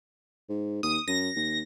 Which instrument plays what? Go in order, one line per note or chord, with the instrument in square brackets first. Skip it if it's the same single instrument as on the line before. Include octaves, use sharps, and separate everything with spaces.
[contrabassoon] G#2
[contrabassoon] D#2 [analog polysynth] D#6
[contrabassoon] F#2 [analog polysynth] A#6
[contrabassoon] D#2